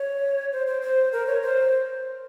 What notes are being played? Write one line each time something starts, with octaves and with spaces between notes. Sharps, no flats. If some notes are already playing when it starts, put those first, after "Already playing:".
Already playing: C#5
C5
C5
C5
A#4
C#5
C5